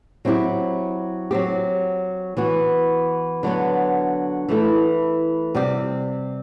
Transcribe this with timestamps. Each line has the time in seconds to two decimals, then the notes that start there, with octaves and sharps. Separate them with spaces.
0.25 F#3 C4 E4 G4
1.31 F#3 C4 G4
2.37 E3 B3 F#4
3.43 D3 F#3 B3
4.49 E3 A3 E4 A4
5.55 C3 G3 C4 G4